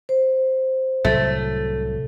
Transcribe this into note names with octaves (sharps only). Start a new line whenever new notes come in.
C5
C2 A2 F#3 A3